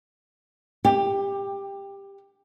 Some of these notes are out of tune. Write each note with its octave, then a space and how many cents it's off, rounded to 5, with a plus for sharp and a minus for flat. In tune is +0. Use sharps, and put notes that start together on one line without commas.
G4 +15